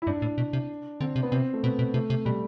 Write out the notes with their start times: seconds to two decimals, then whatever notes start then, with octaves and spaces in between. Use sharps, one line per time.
0.02 E4
0.07 G2 D4
0.22 A2
0.38 B2
0.53 C3
1.01 D3 C4
1.16 C3
1.23 B3
1.32 C3 C4
1.53 A3
1.63 B2 B3
1.79 B2
1.94 C3 A3
2.10 C3
2.25 B2 G3